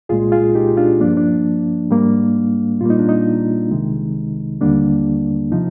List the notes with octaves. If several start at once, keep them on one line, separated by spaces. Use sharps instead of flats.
C2 A#2 G#3 F4 G#4
F4 G#4
D#4 G4
D4 F4
G2 F3 A#3 D4
D4
G#2 G3 A#3
A#2 G3 A#3 F4
D#4
D4
D#4
C2 C3 D#3 G#3
D#2 D3 G3 A#3 D4
C3 F3 D#4